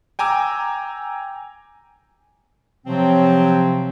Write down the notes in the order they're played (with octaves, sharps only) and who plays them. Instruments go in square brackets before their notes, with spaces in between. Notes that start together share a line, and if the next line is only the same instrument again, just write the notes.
[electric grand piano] G5 G#5 A#5 D6 E6
[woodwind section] C3 F3 F#3 C4